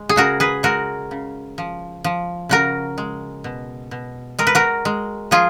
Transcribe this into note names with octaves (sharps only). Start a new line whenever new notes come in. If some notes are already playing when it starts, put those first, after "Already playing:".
Already playing: G#3
G#4
C#3 F#4 A#4
G#4 B4
G#3 F#4 A#4
C#3
F3
F3
C#3 F#4 A#4
G#3
B2
B2
G#3 A#4
B4
F#4 A#4
G#3
F3 F4 G#4